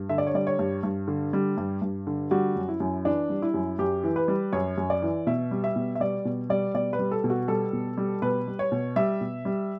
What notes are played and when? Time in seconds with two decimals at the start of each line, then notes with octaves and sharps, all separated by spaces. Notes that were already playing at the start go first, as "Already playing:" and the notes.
Already playing: G2
0.09 D3 E5
0.18 D5
0.27 C#5
0.34 G3 D5
0.47 C#5
0.59 G2
0.83 G2
1.08 D3
1.33 G3
1.57 G2
1.82 G2
2.07 D3
2.31 G3 F#4
2.56 F#2
2.68 E4
2.80 F#2
3.05 E3 D4
3.30 G3
3.42 E4
3.54 F#2
3.79 F#2 G4
4.04 E3
4.16 B4
4.28 G3
4.53 F#2 C#5
4.78 F#2
4.90 D5
5.02 E3
5.27 B2 E5
5.51 G3
5.64 E5
5.76 B2
5.95 E5
6.00 G3 D5
6.25 B2
6.50 G3 D5
6.74 B2 D5
6.93 B4
6.99 G3
7.11 A4
7.24 B2
7.30 F#4
7.48 G3 A4
7.73 B2
7.97 G3
8.22 B2 B4
8.47 G3
8.59 C#5
8.72 B2
8.96 G3 E5
9.21 B2
9.45 G3